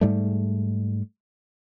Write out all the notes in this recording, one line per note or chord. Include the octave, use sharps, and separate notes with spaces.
G#2 G3 A3